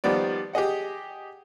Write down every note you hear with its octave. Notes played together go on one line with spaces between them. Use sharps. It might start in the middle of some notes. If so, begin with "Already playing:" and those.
D#3 F3 G3 B3 D5
G4 G#4 D#5 F#5